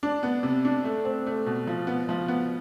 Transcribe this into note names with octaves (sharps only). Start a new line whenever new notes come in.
D4
B3
C3
D4
A3
C4
A3
B2
F3
B3
F3
B3